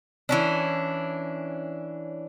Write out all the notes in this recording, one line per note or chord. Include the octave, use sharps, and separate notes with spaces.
E3 C#4 D4